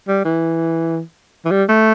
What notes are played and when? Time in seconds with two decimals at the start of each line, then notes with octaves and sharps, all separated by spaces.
0.08 G3
0.25 E3
1.45 E3
1.51 G3
1.69 A3